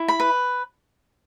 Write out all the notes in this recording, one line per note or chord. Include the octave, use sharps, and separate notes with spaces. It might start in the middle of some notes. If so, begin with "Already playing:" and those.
Already playing: E4
B5
B4